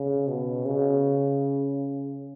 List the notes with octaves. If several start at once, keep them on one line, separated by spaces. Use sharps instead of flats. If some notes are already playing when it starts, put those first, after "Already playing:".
Already playing: C#3
B2
C#3